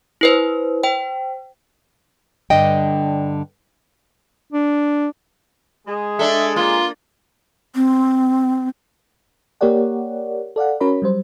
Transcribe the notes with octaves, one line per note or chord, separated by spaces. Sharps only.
E4 B4 C5
C5 G5
G2 D3 D4 D#5 G5
D4
G#3 G#4
D4 A4 E5
A#3 F4
C4
A#3 G4 A#4 C#5 D5 F#5
A4 D5 F5 F#5
C#4 F#4 A#4 C#5 B5
F#3 G3 C5